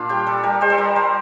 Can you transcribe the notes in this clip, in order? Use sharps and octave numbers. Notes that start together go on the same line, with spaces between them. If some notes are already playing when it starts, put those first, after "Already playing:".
Already playing: A#2 D4 F4
G3 G4
G3 A4
G3 A#4
G3 C5
A4
G3 A#4
G3 C5